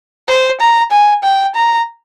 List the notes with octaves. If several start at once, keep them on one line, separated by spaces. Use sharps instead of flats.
C5
A#5
G#5
G5
A#5